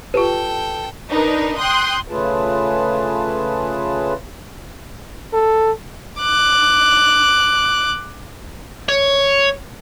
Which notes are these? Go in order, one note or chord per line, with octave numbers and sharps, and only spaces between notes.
F4 G4 A4 B4 G5
D4 D#4 A#4 B4
G5 C6 D#6 F#6 G6
C#3 A3 F4 G#4 B4 A5
A4
D6 F#6
C#5